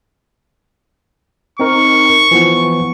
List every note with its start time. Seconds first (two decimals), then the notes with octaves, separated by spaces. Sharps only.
1.60 C4 D#4 A#4 C#6
2.31 E3 F3 B3